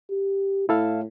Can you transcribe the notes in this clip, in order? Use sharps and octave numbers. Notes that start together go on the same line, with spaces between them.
G4
A2 E4 A4 F5